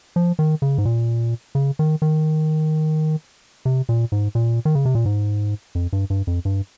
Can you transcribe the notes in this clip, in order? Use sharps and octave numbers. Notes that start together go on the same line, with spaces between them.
F3
D#3
C#3
G#2
A#2
C#3
D#3
D#3
C3
A#2
G#2
A#2
D#3
C#3
C3
A#2
G#2
F2
G2
G2
F2
G2